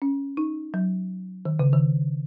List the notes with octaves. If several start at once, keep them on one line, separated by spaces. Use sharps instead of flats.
C#4
D#4
F#3
D#3
C#3
D#3